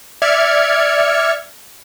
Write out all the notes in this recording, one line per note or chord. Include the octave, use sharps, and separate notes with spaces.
D5 E5 F6 G#6 C#7